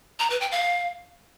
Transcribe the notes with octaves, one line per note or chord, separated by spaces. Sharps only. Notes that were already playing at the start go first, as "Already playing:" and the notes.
A#5
B4
G5
F5